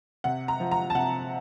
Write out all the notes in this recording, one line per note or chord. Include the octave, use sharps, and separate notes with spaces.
C3 F#5
A#5
F3
A#5
A5
C3 F#5